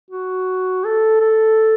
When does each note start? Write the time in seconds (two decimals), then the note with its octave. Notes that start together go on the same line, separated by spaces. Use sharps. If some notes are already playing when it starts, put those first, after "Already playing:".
0.10 F#4
0.85 A4
1.21 A4